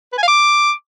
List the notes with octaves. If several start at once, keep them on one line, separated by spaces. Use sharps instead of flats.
B4
G#5
F5
D6